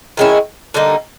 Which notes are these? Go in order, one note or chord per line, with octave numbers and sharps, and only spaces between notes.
D#3 G#3 C#4 E4
D3 G3 A#3 D#4